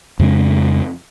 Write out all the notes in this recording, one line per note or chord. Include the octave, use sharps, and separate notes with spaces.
F2 C#3 G#3 D4